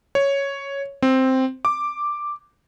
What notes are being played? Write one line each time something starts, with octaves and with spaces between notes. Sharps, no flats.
C#5
C4
D6